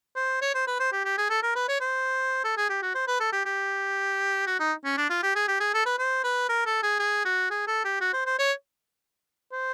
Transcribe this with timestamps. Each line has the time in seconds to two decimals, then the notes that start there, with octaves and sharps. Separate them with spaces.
0.16 C5
0.42 C#5
0.55 C5
0.67 B4
0.80 C5
0.92 G4
1.05 G4
1.18 G#4
1.30 A4
1.43 A#4
1.55 B4
1.68 C#5
1.81 C5
2.44 A4
2.57 G#4
2.70 G4
2.82 F#4
2.95 C5
3.07 B4
3.20 A4
3.32 G4
3.46 G4
4.47 F#4
4.60 D#4
4.85 C#4
4.97 D4
5.10 F4
5.23 G4
5.35 G#4
5.48 G4
5.60 G#4
5.74 A4
5.86 B4
5.99 C5
6.24 B4
6.49 A#4
6.66 A4
6.83 G#4
7.00 G#4
7.25 F#4
7.50 G#4
7.67 A4
7.84 G4
8.01 F#4
8.13 C5
8.26 C5
8.39 C#5
9.53 C5